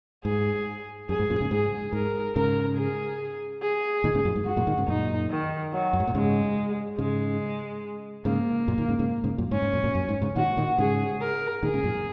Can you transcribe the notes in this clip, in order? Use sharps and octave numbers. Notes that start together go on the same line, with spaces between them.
G#2 G#4
F#2 G#4
G#2
F#2 A#2
G#2 C#3
G#2 G#4
G#2 A#4
G#2 C#3 A#4
G#4
G#4
A#2 D#3
G#2 C#3
F#2 A#2
G#2
G#2 F#4
F#2 A#2
A#2 D#3
G#2 C#3
F#2 A#2 D#4
D#3
F#3
F#2
G#2
A#2
G#2 C#3 G#3
G#2 C#3 G#3
G#2 C#3 A#3
F#2 A#2
A#2 D#3
G#2 C#3
G#2 C#3
G#2 C#3
F#2 A#2
G#2 C#4
G#2
F#2 A#2
F#2 A#2
F#2
G#2
G#2 C#3
A#2 D#3 F#4
A#2 D#3
G#2 C#3 G#4
A#4
A#2 D#3 G#4
G#2 C#3
F#2 A#2